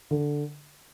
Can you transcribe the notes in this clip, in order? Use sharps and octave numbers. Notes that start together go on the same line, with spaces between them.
D3